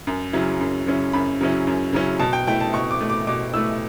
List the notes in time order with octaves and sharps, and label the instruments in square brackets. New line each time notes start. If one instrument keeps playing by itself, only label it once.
[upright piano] F#2
C#3 F#3 C#4 E4
F#2
C#3 F#3 C#4 E4
F#2 B5
C#3 F#3 C#4 E4
F#2
C#3 F#3 C#4 E4
B2 A5
G5
A3 E4 G5
A5
B2 C#6
D6
A3 E4
D6
B2 D6
A3 E4 E6